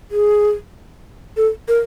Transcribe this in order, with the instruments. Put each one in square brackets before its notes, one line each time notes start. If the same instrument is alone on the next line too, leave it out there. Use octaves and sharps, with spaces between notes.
[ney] G#4
A4
A#4